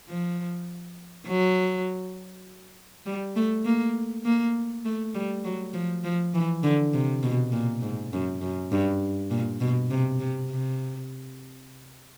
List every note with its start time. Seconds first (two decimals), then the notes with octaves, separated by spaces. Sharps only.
0.08 F3
1.27 F#3
3.06 G3
3.36 A3
3.65 A#3
4.25 A#3
4.85 A3
5.14 G3
5.44 F#3
5.73 F3
6.04 F3
6.34 E3
6.63 D3
6.93 C3
7.23 B2
7.52 A#2
7.82 G#2
8.13 F#2
8.41 F#2
8.72 G2
9.31 A#2
9.60 B2
9.90 C3
10.20 C3
10.51 C3